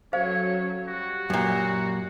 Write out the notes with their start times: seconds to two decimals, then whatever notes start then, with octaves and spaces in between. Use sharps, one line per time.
0.13 F#3 C#4 A4 C5 C#5 F5
0.88 G3 F#4
1.30 F#2 A#2